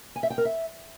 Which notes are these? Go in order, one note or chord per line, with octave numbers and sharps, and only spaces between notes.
G#5
E5
G5
A#4
E5